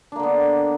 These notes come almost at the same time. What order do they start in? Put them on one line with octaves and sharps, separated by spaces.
D4 A#3 D3 B3